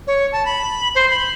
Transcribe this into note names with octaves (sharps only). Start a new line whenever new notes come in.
C#5
A5
B5
C5
B5